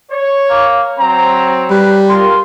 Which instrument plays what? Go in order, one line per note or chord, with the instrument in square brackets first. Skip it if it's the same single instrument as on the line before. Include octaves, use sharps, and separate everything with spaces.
[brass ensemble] C#5
[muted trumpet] A#3
[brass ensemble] F#3 C4 [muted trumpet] A#5
[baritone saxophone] G3 [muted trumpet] B4
[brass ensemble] F4 A#4 [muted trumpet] C6